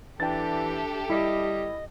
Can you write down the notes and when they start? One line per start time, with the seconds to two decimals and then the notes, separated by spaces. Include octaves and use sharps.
0.20 E3 D4 G4 A4 E5 G5 A6
1.10 G3 E4 D#5